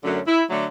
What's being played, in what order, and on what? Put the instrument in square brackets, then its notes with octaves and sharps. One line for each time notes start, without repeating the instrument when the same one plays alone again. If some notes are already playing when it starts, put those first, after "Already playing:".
[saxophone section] F#2 D3 F#3 A3 C#4
E4
D3 F#3 A3